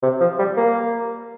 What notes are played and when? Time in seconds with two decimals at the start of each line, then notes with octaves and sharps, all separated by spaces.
0.03 C3
0.20 F3
0.39 G3
0.57 A#3